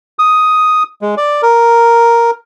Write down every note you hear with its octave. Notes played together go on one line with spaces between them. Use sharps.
D#6
G#3
D5
A#4